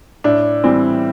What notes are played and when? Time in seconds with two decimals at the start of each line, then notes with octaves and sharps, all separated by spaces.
0.24 A2 D4
0.64 E3 G3 C4